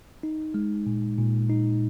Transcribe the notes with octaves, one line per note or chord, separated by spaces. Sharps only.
D#4
G#3
A#2
A#2
D#4